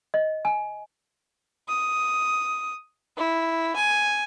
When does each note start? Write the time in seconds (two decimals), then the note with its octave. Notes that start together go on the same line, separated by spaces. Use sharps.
0.14 D#5
0.45 G#5
1.69 D#6
3.17 E4
3.76 G#5